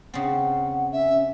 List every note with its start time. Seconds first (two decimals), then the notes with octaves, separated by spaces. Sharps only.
0.14 C#3 C4 F#5
0.92 C#4 E5